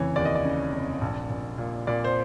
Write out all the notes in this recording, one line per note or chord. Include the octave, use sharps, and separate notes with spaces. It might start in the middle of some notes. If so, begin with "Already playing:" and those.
Already playing: F1 C#3 E3 C#5
D#2 D5
D#5
D5
C#3
F1
A#1
A#1
A#2
A#2 D5
C5